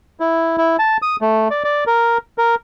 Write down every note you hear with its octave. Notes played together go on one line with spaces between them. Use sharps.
E4
E4
A5
D#6
A3
D5
D5
A#4
A#4